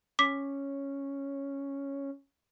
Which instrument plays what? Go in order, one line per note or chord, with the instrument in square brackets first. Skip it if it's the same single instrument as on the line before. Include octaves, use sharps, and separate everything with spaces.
[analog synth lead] C#4 [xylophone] D6 B6